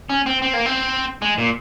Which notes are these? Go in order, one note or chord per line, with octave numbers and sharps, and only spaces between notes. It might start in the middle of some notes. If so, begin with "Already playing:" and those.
C#4
C4
C4
A#3
C4
G#3
A#2